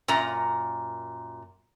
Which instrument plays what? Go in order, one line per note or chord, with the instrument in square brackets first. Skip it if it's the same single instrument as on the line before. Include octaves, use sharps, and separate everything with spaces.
[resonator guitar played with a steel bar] F#2 A#2 A#5